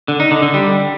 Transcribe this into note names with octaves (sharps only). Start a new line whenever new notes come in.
D3
D#4
D3
D3
G3